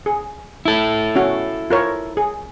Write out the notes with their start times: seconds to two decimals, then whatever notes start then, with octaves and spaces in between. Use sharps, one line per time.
0.06 G#4
0.65 E4 A4
1.16 C#4 F#4
1.70 F4 A#4 C#5
2.17 G#4